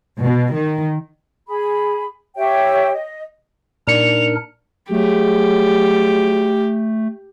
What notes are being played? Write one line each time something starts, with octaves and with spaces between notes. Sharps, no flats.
B2
D#3
G#4 B5
G4 C#5 E5 G5
D#5
A#2 D4 D#4 A#4 D5 C#7 F7
F#3 A3 G4 G#4